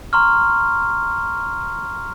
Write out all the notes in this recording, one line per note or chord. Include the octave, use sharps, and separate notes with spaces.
A#5 C6 C#6 F6